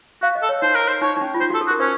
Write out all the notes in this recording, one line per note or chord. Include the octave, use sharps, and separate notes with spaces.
F#4 F5
D#5
A4
C#5
D#4 C5
A#4
C5
D#4 C#5
D#4
C#4
F4
D#4 C5
F#4 A4
A4
F#4
A#4
C#4 C5